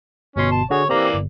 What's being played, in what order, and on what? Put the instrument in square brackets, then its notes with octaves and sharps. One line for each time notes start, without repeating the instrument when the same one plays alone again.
[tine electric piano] G1 B2 C6 [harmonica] C#4
[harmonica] A5
[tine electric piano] D3 F#4 G#4 [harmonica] C#5
[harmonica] E3 A#3 D5 [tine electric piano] C4 G4 A#5
[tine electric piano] G1